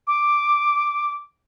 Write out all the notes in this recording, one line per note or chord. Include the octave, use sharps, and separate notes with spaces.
D6